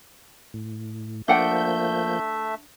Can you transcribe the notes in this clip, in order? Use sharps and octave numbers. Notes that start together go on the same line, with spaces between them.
A2
F3 A3 A#3 D4 E5 F#5 G5 G6